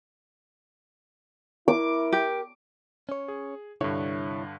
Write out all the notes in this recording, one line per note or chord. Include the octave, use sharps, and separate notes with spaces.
E4 A#4 D6
G4
C#4 C#5
G#4
C2 G2 D3 E4 C#5